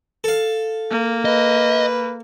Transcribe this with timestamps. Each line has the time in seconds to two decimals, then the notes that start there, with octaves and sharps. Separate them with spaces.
0.24 A4 F5
0.91 A#3
1.25 B4 D#5